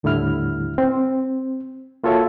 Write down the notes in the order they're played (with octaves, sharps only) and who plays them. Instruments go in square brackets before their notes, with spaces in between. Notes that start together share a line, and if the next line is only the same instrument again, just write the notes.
[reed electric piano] D#2 A2 D3 G3 E4 F6
C4
A#3 F4 F#4 A4 C#5 E5